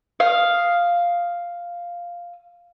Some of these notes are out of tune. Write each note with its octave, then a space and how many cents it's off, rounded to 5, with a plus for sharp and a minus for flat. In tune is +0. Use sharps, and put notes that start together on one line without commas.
F5 +0 D#6 +0